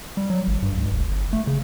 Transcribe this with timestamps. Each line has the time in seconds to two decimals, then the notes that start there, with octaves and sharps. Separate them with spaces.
0.17 G3
0.30 F#3
0.48 G#1
0.63 G2
0.78 C#2
0.92 F1
1.08 G1
1.33 A3
1.47 C#3